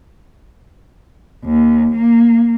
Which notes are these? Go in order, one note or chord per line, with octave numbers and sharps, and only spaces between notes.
D#2
A#3